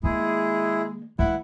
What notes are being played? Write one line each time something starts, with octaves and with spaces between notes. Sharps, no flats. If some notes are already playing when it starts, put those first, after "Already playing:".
D#3 G#3 A#3 E4 G#4
E3 G#3 E4 F#5